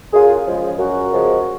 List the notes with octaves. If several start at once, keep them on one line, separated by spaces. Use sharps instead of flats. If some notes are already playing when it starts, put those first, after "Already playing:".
F#2 F4 G#4
C#3 F3 G#3
F#2 F#4 A#4
C#3 F3 G#3